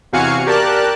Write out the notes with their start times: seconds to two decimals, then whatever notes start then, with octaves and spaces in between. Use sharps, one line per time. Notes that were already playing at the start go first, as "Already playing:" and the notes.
0.12 E2 C3 F#4 F5 G#5 C#7
0.46 G4 A#4 D5 A5 F#6